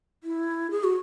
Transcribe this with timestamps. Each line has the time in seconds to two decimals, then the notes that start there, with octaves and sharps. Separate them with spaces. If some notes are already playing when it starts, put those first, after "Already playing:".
0.24 E4
0.71 G#4
0.84 F#4